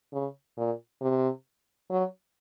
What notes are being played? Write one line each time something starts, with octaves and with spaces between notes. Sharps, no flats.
C#3
A#2
C3
F#3